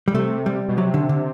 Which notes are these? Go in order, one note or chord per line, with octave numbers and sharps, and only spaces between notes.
G3
C3 A3
G3
B2
C3 F#3
D3
D3